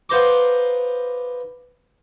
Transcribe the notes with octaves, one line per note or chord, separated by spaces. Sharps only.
B3 F4 C5 A#5 D6